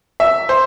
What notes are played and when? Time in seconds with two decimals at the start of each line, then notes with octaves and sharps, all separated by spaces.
0.20 E5
0.49 C5